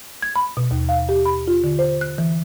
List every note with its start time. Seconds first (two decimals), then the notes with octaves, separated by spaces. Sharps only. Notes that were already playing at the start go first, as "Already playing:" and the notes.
0.22 G#6
0.36 B5
0.57 B2
0.71 D#2
0.89 F5
1.09 G4
1.26 B5
1.47 F4
1.64 D3
1.79 C5
2.01 F#6
2.18 E3